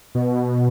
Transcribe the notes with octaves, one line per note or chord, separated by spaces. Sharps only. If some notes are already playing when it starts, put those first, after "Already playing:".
B2